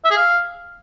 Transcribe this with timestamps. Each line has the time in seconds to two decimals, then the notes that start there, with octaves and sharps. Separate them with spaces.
0.04 E5
0.11 G#4
0.17 F5